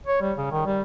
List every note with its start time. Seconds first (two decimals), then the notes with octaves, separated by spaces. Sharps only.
0.07 C#5
0.21 G3
0.37 C#3
0.51 D#3
0.65 G3